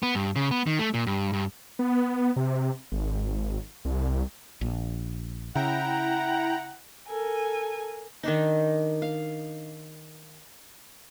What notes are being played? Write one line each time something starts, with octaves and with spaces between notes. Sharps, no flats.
B3
G2
C#3
B3
D#3
A3
A#2
G2
G2
B3
C3
G#1
C2
A#1
C#3 E4 F#5 G5 A#5
A4 A#4 G#5
D#3 D4 D#4
F5